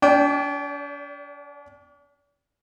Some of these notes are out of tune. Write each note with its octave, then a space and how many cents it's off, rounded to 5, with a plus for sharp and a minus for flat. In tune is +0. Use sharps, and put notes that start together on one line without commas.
D4 -45 D5 -15 G5 +0